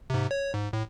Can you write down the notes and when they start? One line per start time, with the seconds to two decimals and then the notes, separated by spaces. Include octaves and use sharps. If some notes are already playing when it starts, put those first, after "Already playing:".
0.10 G#2 C3
0.31 C#5
0.54 G#2
0.73 A2